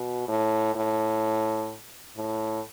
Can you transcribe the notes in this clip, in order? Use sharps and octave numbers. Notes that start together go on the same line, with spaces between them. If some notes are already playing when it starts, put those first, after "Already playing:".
Already playing: B2
A2
A2
A2